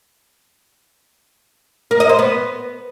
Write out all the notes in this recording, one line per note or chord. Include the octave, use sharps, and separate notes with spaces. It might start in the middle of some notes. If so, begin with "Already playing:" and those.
A#4
D#5
C5
B3